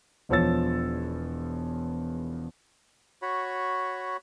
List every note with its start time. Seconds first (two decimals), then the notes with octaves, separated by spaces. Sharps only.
0.29 E1 E2 F3 C#5 E6 A6
3.22 F#4 C#5 B5